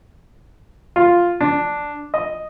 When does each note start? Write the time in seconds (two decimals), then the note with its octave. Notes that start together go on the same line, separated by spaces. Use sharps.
0.96 F4
1.41 D4
2.14 D#5